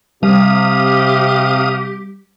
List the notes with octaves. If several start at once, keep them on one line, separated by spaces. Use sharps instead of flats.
C3 G3 G4 F5 D#6